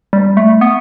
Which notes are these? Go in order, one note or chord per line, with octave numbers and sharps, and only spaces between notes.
G3
A3
B3